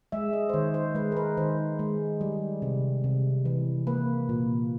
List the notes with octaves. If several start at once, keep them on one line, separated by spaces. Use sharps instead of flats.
G#3 E5
D#5
C5
D#3 C#5
C5
G#3 B4
A#4
B4
D#3 C5
G#3
G3
C3
C3
E3
A#3 B4
A#2